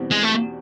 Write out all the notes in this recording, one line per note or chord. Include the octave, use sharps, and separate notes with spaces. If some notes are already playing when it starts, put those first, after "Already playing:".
Already playing: E2 B2 G3 C4
G#3
A3